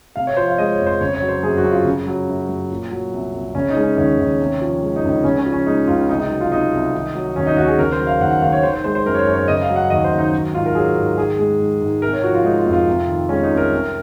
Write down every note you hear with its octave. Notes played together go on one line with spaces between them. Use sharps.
C3 F5
C#5
F3 C5
F5
G#3 D#5
C#5
F2
C5
C#3 C#5
C#5
F#3
C5
F#2 G#4
F#4
F#2
F4
C#3
F#3
F#2
F#2
A#2
F#3
C2
C2
C#3 C#4
D#4
G#3
C#4
D#2 C#4
D#2
C3
F3
G#3
D#4
C#2
D#4
C#3 C#4
C#4
F3
C#4
G#3 D#4
C#2 F4
C3 D#4
D#4
F#3
F4
C2 D#4
C2
D#3
F#3
D#2 C#4
D#4
D#2 F#4
G#4
C#3 A#4
C5
F#3
F5
D#2 F#5
F#5
D#2 F5
C#5
D#3 C5
C5
G#3 C5
C5
F#2 A#4
C#5
C5
F#2
C#5
C#3 D#5
F5
F#3
F#5
D#2 D#5
C5
D#2
D#4
F#3
G#2 F4
A#4
F#3 G#4
G#2
D#3 G#4
G#3
G#2
G#2
C3 A#4
C#5
F3 F#4
F4
G#3 D#4
F4
F2
F4
C3
D#3
G#3 C#4
D#4
C2
A#4
C3